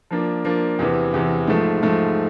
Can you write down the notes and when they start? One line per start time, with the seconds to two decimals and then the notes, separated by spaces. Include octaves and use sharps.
0.11 F3 A#3 D4
0.45 F3 A#3 D4
0.79 E2 C3 E3
1.14 E2 C3 E3
1.48 G#2 F3 A3
1.83 G#2 F3 A3